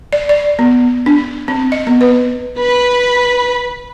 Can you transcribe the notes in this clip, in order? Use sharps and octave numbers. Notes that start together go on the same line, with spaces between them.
D5
D5
B3
D4
C4
D#5
B3
B4
B4 B5